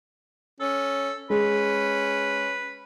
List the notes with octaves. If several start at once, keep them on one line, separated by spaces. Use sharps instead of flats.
C#4 A4
G#3 C#4 B4